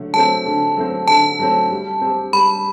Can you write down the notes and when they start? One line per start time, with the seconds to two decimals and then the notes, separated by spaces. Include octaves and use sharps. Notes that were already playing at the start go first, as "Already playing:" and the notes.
Already playing: D3 F#3 A3
0.14 F#3 A3 C4 A5
0.46 D3
0.77 F#3 A3 C4
1.08 D3 A5
1.39 F#3 A3 C4
1.71 G3
2.01 C4
2.06 G4
2.33 G3 B5